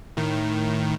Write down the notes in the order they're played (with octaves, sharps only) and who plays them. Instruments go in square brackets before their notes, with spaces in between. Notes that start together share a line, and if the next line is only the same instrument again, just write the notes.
[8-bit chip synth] A2 D#3